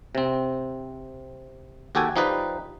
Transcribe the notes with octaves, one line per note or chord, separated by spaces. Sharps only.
C3 C4
D#2 F#4 G4 A4 G5 G#5
F3 D#4 G4 B4 D5